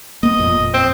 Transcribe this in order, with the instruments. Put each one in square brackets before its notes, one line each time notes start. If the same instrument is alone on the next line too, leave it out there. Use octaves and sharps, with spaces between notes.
[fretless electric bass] A#3 B3 [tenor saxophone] D#5
[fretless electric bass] F#1 F2 A#2
[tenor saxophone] C4